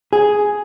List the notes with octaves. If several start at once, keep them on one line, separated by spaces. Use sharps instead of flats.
G#4